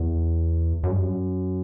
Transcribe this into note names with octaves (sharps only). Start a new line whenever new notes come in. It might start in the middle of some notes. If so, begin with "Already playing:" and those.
Already playing: E2
F#2
G2
F#2